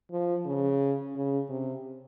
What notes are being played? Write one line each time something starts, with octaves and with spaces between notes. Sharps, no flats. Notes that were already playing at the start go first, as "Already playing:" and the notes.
F3
C#3
C#3
C3